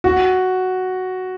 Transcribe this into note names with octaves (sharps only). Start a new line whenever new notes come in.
F#4